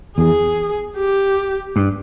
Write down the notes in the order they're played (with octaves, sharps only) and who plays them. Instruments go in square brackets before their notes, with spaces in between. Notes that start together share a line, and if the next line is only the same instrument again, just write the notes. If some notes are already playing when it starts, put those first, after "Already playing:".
[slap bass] E2 [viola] G#4
[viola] G4
[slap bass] G2